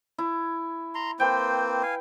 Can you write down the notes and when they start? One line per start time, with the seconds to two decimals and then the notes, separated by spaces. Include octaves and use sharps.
0.18 E4
0.95 A#5 C6
1.20 A#3 C4 B4 C5 G5
1.83 F5 G#5